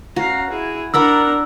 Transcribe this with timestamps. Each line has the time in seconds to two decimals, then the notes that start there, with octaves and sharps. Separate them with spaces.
0.16 C#4 F#4 F5 A#5
0.50 E4 G#4
0.94 D4 A#4 D5 F#5 A#5 B5 E6